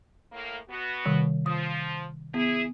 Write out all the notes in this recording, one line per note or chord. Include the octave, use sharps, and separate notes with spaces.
A2 A#3
B2 B3 F#4
C3 D#3 G3
F3 D#6
B3 E4 G#4